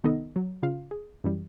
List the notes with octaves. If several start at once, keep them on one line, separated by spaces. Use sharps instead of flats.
C2 D#3 B3 D#4 A4 D#5
F#3
C#3 F4 F5
G#4
F#2 E3 G3